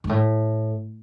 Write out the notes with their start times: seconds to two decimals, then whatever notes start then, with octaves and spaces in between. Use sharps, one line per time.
0.04 G#2
0.09 A2